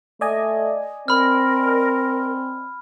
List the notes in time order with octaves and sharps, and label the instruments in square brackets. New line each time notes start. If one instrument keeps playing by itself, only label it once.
[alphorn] A3 [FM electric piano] D5 D#5 G#5
[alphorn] C4 [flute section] A#4 [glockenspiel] B5 F6